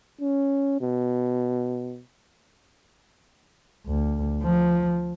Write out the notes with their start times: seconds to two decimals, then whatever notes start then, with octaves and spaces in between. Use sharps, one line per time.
0.21 C#4
0.81 B2
3.86 D2
4.43 F3